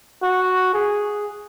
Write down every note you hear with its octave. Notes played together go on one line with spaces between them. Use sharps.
F#4
G#4